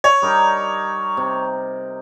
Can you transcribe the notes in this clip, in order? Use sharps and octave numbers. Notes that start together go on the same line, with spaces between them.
C#5
G3 D#4 A#4
C3